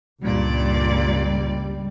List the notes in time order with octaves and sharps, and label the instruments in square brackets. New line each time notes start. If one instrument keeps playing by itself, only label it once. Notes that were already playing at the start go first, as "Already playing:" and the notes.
[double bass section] C#2 G3 [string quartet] G2 A#2 D5